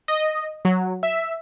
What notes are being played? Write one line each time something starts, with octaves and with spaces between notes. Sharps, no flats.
D#5
F#3
E5